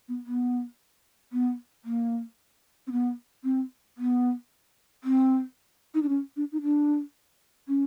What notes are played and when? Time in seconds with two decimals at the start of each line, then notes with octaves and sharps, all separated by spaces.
0.08 B3
0.26 B3
1.32 B3
1.85 A#3
2.87 C4
2.92 B3
3.44 C4
3.98 B3
5.04 C4
5.94 D#4
6.02 D4
6.09 C#4
6.36 D4
6.52 D#4
6.62 D4
7.68 C#4